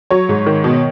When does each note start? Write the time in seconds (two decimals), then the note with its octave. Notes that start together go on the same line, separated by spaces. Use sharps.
0.10 F#3 C#5
0.29 G#2
0.46 D#3
0.64 B2